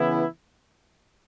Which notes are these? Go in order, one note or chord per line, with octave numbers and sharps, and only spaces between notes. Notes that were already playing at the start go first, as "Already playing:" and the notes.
Already playing: C#3 E3 B3 E4